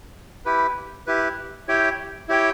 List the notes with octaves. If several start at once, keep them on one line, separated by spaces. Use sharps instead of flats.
E4 G4 B4
E4 G4 B4
E4 G4 C#5 G5
E4 G4 C#5 G5